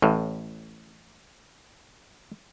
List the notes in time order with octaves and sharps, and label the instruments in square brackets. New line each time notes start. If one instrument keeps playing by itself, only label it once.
[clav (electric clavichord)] A1 A2